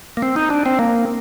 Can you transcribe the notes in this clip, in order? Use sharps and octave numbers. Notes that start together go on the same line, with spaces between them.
A#3
C4
D#4
D4
C4
A#3